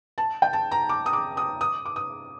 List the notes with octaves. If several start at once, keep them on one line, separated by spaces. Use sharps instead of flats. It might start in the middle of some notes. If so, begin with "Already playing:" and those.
A5
G5
A5
A#5
D6
D#6
D6
D#6
D#6
D6
D#6